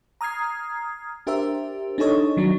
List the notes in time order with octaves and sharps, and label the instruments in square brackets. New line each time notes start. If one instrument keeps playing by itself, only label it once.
[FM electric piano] A#5 D#6 F6 G#6 C7
D4 G4 A#4 C5 E5
D4 D#4 G#4 A4 C#5 D#5
D#3 F#3 D4 D#4